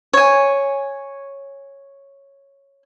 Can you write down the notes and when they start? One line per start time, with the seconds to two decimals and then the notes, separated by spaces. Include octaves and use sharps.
0.13 C#5 G#5